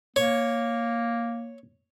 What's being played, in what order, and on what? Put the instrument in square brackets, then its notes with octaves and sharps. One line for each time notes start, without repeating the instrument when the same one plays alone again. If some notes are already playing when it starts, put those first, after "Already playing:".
[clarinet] A#3 [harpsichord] C#5